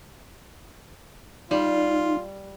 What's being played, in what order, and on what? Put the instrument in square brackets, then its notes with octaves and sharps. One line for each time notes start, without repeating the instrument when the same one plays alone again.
[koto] G3 [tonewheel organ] D#4 [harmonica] F4